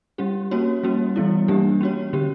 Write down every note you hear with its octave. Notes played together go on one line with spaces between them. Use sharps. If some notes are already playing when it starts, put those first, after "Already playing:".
G3 C#4 G4
A#3 C#4 F#4 C#5
G3 A#3 C#4 F#4
E3 G3 B3 E4
E3 G3 A#3 D4 G4
C#4 F#4 C#5
D3 F#3 C#4 G4